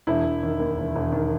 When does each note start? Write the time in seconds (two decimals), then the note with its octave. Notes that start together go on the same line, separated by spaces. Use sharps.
0.07 E1 E4
0.25 E1
0.43 D#3
0.60 D#2
0.78 E1
0.95 E1
1.12 D#3